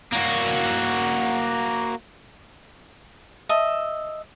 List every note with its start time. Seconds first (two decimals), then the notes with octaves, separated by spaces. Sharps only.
0.13 A#3 F#4
3.49 D#5 E5 A5